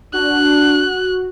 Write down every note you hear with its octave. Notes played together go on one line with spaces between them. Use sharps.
D4 F#4 F#6